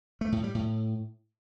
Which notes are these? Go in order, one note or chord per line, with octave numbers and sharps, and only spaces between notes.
A3
A2
G3
A2